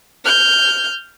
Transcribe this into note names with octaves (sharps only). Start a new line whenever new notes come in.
F6 G6